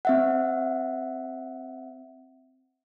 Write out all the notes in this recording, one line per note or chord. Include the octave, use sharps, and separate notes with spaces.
C4 E5 F#5